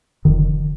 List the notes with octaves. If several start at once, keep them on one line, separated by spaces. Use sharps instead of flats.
F1 F2 D3 D#3